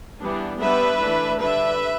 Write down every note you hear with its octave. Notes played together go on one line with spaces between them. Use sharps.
E3 G3 B3 D4
G3 B3 D4 B4 E5
E3 A3 D4
D3 G3 D4 B4 E5